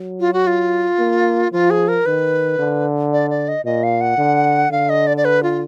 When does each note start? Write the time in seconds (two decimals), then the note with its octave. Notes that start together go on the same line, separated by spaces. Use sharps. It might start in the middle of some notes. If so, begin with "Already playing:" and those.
Already playing: F#3
0.20 F4
0.33 F#4
0.47 F4
0.99 A#3
1.52 F3 F4
1.70 G#4
1.88 A#4
2.06 D#3 B4
2.59 D3
3.13 D5
3.30 D5
3.48 D#5
3.65 A#2 D#5
3.83 F5
4.01 F#5
4.18 D3
4.71 D3 F5
4.89 D#5
5.07 D5
5.17 D5
5.25 B4
5.43 F4